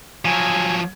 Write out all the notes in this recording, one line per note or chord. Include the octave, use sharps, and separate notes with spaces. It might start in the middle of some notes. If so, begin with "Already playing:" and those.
F3 F#3 G#5